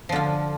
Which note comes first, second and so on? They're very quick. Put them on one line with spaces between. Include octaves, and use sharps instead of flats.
F3 D3 F4